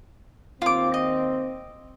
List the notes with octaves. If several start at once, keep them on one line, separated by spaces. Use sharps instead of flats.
D#2 C4 F4 D6
D#5